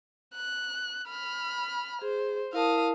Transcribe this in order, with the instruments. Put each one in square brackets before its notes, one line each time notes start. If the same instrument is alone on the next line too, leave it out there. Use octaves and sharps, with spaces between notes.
[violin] F#6
B5 F6
[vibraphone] G#4 [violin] C5
[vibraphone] E4 A#4 A5 [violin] F5 D#6